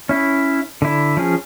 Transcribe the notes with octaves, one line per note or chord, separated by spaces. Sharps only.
C#4 E4
D3 E4
F3 C#4 G#4